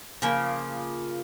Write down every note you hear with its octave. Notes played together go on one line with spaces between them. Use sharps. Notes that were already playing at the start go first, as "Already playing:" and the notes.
C#3 F3 A#3